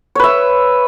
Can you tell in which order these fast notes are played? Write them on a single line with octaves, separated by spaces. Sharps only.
C#5 B4 E5